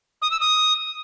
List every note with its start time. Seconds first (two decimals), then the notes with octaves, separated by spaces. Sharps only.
0.22 D#6
0.31 E6
0.40 D#6